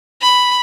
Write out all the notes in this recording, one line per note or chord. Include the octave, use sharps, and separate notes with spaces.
B5